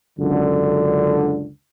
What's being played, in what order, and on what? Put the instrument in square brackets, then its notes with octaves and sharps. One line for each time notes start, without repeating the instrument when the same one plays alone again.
[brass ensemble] C#2 F#2 D3